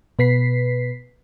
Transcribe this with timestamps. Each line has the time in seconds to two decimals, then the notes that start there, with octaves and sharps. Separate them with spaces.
0.19 B2 B4 B6 C7